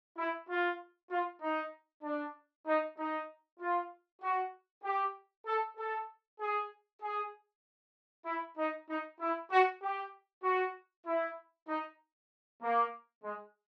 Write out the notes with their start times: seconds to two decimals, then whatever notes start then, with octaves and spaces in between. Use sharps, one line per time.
0.18 E4
0.49 F4
1.11 F4
1.42 D#4
2.04 D4
2.67 D#4
2.98 D#4
3.60 F4
4.22 F#4
4.84 G4
5.46 A4
5.78 A4
6.40 G#4
7.02 G#4
8.26 E4
8.58 D#4
8.89 D#4
9.20 E4
9.51 F#4
9.82 G4
10.44 F#4
11.07 E4
11.69 D#4
12.62 A#3
13.24 G#3